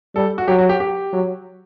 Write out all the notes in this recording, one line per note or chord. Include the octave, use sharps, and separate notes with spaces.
G3 A4
F#4
F#3 G4
F#4
G4
G4
F#3